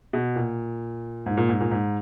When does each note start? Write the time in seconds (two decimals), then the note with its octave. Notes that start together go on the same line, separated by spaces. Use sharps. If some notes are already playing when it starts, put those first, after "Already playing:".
0.13 B2
0.36 A#2
1.26 G#2
1.37 A#2
1.49 G#2
1.60 A#2
1.71 G#2